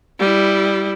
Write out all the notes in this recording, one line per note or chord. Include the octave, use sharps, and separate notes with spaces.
G3 E4